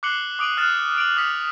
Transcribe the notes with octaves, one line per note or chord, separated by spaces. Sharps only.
D6 F#6 C7 C#7 F#7 G7
D6 D#6 D7 D#7 F#7
D#6 F6 F#6 A6 E7
D#6 D7 F7 F#7
D#6 F#6 B6 C#7